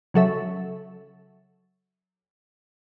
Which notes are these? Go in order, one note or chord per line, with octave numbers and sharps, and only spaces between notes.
C#3 F#3 A4 E5